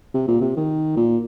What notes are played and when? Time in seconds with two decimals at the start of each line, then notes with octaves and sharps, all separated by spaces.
0.14 C3
0.28 A#2
0.41 C3
0.57 D#3
0.97 A#2